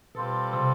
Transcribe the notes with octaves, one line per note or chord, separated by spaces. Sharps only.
B2 G3 C4 F4 A4
C3